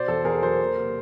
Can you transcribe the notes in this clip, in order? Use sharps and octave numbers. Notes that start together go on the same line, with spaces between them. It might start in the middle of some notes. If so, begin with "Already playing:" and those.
Already playing: B2 C5 D5
E2 A4
E2 G#4 A#4
F#3 A#4 C5
A#3
C3